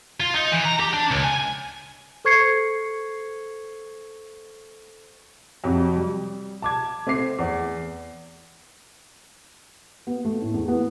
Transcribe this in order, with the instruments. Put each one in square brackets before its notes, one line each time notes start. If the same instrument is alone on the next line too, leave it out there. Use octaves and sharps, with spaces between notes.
[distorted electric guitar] F4
D#4
E3
A#5
G4
D4
C#2
G#5
[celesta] A4 C5 C#6 G#6 C7 C#7
[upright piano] F2 C3 F#3
G3
A5 D6 G#6
A3 C4 D6 C7
E2
[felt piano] B3
A3
A2
E2
B3